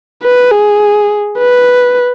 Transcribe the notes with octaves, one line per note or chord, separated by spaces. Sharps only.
B4
G#4
B4